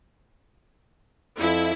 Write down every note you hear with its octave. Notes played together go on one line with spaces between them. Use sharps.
F2 E4